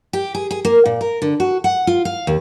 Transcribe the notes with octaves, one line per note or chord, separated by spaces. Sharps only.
G4
G#4
G#4
A#3
A#2
A#4
D3
F#4
F#5
F4
F5
D#2